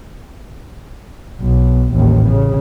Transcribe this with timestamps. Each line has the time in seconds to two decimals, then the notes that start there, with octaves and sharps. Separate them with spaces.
1.42 B1
1.95 A1 D#2
2.30 C#3